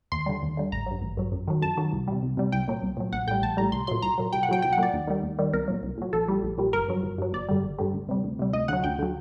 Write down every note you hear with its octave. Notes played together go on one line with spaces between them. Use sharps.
D#2 C6
D3 G3
D#2
D3 G3
A1 A#5
G2 F#3
A1
G2 F#3
F#2
D#3 F#3
F#2 A5
D#3 F#3
C2
C3 G3
C2
C3 G3
C2 G5
A#2 F#3
C2
A#2 F#3
A#1 F#5
A2 G3 G5
A#1 A5
A2 G3 A#5
C2 C6
A#2 F#3 C6
C2 A#5
A#2 F#3
C2 G5
F#5
A#2 F#3 G5
C2 G5
F#5
A#2 F#3 D5
D#2
D#3 G3
D#2
D#3 G3
C2 A#4
A#2 F#3
C2
A#2 F#3
A#1 A4
A#2 G3
A#1
A#2 G3
G1 A#4
G2 F#3
G1
G2 F#3
G1 D5
G2 D3 G3
G1
G2 D3 G3
D2
C3 G3
D2
C3 G3
D2 D#5
D3 F#3 F#5
D2 G5
D3 F#3